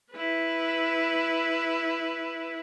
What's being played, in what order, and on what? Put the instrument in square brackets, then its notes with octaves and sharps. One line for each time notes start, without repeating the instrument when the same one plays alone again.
[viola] E4 B4